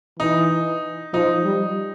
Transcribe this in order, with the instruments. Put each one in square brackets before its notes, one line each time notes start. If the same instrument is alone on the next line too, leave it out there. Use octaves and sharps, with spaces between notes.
[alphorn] E3 [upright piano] D#4
[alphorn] F3 [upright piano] D#4
[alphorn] G3